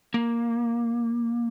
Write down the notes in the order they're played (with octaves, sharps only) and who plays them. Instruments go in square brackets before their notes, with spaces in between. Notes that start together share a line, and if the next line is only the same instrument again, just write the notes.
[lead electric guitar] A#3